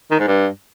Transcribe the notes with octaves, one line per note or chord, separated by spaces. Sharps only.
D#3
G#2
G2